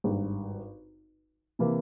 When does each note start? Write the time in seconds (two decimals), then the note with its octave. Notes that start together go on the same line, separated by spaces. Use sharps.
0.04 G#1 G2 G3
1.59 C3 E3 A#3